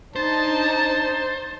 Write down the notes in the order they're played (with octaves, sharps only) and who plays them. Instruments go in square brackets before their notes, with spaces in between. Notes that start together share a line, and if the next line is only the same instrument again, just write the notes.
[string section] D4 D#4 [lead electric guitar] C5 [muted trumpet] A5 [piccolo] A6